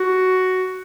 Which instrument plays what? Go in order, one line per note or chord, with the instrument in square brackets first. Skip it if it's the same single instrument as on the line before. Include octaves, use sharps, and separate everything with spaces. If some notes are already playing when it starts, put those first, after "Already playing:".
Already playing: [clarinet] F#4